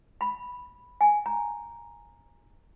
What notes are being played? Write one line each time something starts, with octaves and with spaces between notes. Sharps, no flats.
B5
G#5
A#5